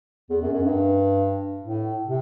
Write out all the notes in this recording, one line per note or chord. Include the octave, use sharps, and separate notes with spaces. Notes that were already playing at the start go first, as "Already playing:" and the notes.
E2
F#2
F#2
G2
A2
C3